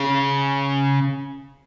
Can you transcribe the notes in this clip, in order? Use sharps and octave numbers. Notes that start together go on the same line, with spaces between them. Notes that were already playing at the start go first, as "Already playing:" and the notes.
Already playing: C#3